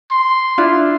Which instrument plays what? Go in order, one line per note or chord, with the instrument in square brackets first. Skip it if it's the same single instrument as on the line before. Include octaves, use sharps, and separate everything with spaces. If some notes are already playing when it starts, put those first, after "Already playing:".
[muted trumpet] C6
[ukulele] D4 E4 F4